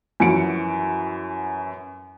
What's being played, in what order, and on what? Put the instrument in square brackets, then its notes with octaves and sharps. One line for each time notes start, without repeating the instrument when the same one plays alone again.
[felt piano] F#2 E3 F3 F#4 C#7 D7